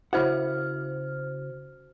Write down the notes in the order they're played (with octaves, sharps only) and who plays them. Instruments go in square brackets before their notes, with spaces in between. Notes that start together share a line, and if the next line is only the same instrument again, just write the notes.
[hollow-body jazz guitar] C#3 E4 F#5 [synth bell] F#4 C5 F6